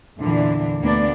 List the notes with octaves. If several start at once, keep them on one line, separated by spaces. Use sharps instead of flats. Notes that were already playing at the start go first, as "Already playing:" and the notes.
E2 A#2 D3 E3 D4
D2 A#3 B3 D4 D5